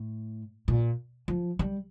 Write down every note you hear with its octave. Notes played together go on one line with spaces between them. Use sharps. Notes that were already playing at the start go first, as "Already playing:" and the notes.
Already playing: A2
A#2
F3
G3